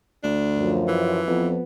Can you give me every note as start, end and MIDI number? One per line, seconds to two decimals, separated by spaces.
0.24 0.92 38
0.24 0.73 62
0.58 1.21 42
0.58 1.21 53
0.88 1.49 52
1.27 1.57 41
1.27 1.63 53
1.27 1.63 59